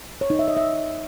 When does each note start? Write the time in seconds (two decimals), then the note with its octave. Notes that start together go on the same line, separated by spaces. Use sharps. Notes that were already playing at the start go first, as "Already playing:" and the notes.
0.21 C#5
0.30 D#4
0.39 E5
0.48 D#5
0.57 E5